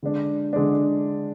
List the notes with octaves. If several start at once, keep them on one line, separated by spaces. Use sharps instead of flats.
D3 G#3 D4
D3 G#3 D4